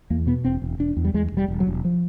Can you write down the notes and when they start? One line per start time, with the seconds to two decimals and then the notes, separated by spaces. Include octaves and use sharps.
0.10 E2 A#3
0.27 B2 B3
0.45 E1 C4
0.62 E1
0.79 E1 D4
0.97 E2
1.05 G3
1.14 E2 G#3
1.32 E1 G3
1.48 E1
1.60 F#3
1.67 E1
1.85 F3